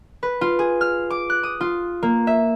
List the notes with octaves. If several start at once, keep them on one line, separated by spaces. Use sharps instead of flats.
B4
F4
G#4
F6
D6
F#6
D#6
F4
A#3
E5